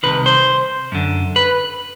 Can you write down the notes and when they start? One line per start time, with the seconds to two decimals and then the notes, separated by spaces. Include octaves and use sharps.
0.03 C2 C3 D#3 B4
0.26 C5
0.92 F#2 D3
1.36 B4